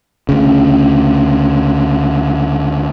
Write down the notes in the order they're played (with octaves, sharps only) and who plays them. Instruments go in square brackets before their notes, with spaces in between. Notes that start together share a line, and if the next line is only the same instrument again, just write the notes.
[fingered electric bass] D2 C#3